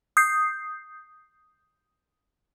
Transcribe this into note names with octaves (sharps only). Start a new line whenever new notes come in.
D#6 G6 C7